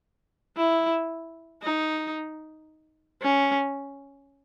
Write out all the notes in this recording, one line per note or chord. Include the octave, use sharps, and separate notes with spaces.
E4
D#4
C#4